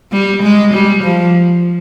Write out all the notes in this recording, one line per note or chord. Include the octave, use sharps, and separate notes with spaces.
G3
G#3
G3
F3